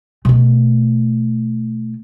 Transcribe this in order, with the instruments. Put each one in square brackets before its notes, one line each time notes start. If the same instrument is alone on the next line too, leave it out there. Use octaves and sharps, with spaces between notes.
[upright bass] B2 A3